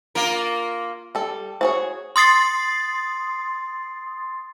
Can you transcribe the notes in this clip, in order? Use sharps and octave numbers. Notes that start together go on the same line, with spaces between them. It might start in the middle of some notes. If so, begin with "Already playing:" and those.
A#3 F4 A#4
G3 A4
F#4 G#4 C5 C#5
C6 D#6 A6 C7